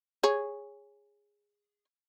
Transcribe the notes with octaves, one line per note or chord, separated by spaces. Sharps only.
G#4 C#5